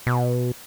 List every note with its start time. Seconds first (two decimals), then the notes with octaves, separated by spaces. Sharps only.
0.07 B2